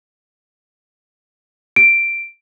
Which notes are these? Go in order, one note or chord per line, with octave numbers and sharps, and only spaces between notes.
D7